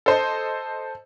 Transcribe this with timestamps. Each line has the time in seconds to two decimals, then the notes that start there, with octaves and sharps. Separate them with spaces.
0.06 A4 C5 D#5